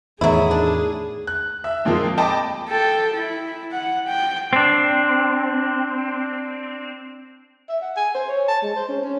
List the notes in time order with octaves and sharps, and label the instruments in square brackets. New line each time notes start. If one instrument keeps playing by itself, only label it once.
[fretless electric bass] E2 A2 D#3 [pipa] F#3 E4 [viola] G#4
[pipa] D4
[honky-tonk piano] F#6
E5
F2 A#2 F3 G#3 A#3 C4
D#5 G5 A5 B5 D6
[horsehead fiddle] A4 G5
E4
F#5
G5
[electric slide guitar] C4 D4
[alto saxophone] E5
F#5
G#5
C5
C#5
A5
G#3
C5
C#4
C#4